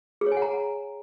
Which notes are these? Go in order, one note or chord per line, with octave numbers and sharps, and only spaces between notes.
G#4
C#5
G#5
F#5
A#5